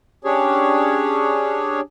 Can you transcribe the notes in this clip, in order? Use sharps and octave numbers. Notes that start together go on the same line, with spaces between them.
C#4 D4 G4 G#4 C#5